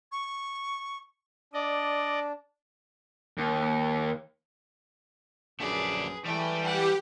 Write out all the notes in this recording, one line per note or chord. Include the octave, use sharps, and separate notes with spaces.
C#6
D4 D5 D#5
D#2
A#1 F#2 A3 G#4 B4 D5
E3 G3 A3 G5
G4 B4 F#5